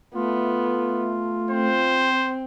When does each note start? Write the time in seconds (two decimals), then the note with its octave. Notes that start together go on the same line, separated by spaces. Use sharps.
0.15 A3 B3 F4
1.51 C4 C5